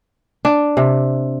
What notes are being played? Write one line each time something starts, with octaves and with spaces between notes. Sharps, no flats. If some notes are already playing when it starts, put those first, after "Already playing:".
D4
C3